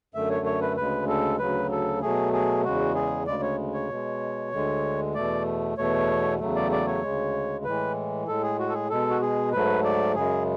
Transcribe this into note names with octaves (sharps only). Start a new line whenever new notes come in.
F#2 D3 A3 E5
C#5
C#5
B4
D2 C#3 G#3 B4
A4
D2 C#3 F#3 B4
A4
B2 F#3 A3 G#4
G#4
E2 C#3 G#3 F#4
G#4
D2 C#3 G#3 D5
C#5
C#5
B2 G#3
D2 D3 G#3
E2 B2 A3 D5
E2 B2 A3 C#5
E2 C#3 F#3 A3
D5
D5
C#5
D2 C#3 G#3
A2 E3 G#3 B4
A2 G#3 A4
G#4
F#4
A4
G#4
B2 G#3 A4
F#4
G#4
G#2 F#3 A3 B4
D5
F#2 C#3 G#3 G#4